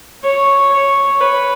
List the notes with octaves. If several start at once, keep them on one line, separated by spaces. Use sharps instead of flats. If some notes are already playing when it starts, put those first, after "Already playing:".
C#5
C#5
B4